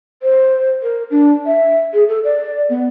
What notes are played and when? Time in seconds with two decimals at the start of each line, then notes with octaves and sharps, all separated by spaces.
0.23 C5
0.83 A#4
1.11 D4
1.46 E5
1.94 G#4
2.08 A4
2.24 D5
2.70 B3